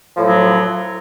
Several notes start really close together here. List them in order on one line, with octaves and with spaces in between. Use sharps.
F3 A2 F#3 F#2